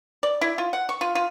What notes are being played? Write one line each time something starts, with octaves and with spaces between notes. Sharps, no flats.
D5
E4
F4
F#5
C#6
F4
F4